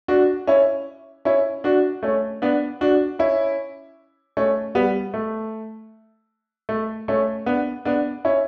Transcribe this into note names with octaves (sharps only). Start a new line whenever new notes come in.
D4 F#4
C#4 E4
C#4 E4
D4 F#4
A3 C#4
B3 D4
D4 F#4
C#4 E4
A3 C#4
G3 B3
A3
A3
A3 C#4
B3 D4
B3 D4
C#4 E4